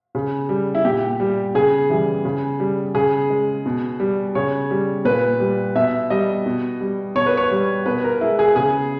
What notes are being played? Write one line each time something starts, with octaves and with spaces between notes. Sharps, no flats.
C#3
G3
E4
A#2 G4
G3
C#3 G#4
E3 G3
C#3
G3
C#3 G#4
G#3
B2
G3
C#3 C#5
G3
A#2 B4
G3
B2 E5
G3 D#5
B2
G3
B2 C#5
B4
C#5
G3
B2 B4
A#4
G#3 E4
G#4
C#3 G#4